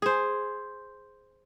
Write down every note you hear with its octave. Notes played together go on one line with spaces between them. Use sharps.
G#4 C5